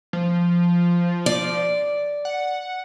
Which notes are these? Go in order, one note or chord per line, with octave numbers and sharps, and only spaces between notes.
F3
D5
F#5